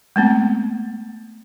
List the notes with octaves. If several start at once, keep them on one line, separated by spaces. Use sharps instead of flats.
G#3 A3 B3 C4